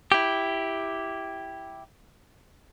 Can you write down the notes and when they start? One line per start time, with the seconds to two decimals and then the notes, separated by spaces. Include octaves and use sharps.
0.12 E4 G4